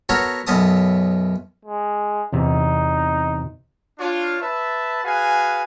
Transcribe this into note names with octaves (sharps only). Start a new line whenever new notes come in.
B3 F#4 A4 A#4 C#5
B1 F#2 B3 A5 D#6
G#3
E2 C3 D#4
D4 F4 C#5
B4 E5 A5
F#4 G#4 B4 F5 F#5 G#5